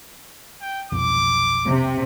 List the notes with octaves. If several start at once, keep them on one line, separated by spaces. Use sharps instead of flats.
G5
F1 B1 F2 D6
C3